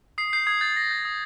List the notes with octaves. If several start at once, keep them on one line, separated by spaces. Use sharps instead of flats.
D#6 C7
G6 C7
D#6 G#6
G6 A6
D#6 A#6
G6
D#6